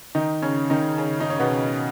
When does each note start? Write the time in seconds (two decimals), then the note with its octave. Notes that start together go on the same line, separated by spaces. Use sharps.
0.15 D#3 D#4
0.42 C#3 C#4
0.70 D#3 D#4
0.98 C#3 C#4
1.20 D#4
1.30 C#4
1.39 B2 B3